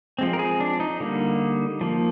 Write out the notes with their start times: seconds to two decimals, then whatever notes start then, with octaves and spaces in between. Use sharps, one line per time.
0.19 F3 G#3 C4
0.33 A#4
0.39 G#4
0.60 D4
0.80 D#4
1.00 D3 G3 A#3
1.81 F3 A#3